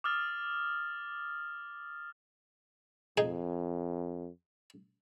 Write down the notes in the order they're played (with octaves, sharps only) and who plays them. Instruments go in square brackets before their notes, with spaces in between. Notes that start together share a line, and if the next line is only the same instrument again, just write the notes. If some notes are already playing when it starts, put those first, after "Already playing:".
[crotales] D6 D#6 F6 A6
[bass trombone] F2 [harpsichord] D#4 G#4